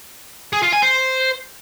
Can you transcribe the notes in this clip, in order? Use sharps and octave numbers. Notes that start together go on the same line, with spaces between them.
G#4
F4
G#5
C5